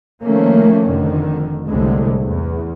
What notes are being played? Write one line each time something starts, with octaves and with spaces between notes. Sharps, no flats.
D#3 F3 A3 A#3 C#4
F1 F2 D3 D#3
C2 A2 D3 G#3
E2